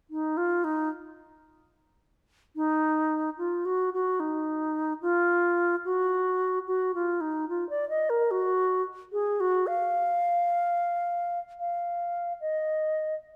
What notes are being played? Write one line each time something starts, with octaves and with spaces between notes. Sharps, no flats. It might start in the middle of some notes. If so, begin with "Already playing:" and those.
D#4
F4
D#4
D#4
F4
F#4
F#4
D#4
F4
F#4
F#4
F4
D#4
F4
D5
D#5
A#4
F#4
G#4
F#4
F5
F5
D#5